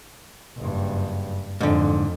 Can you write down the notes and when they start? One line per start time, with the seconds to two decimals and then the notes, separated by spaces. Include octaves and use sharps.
0.58 F#1 G2
1.61 F2 G#2 D3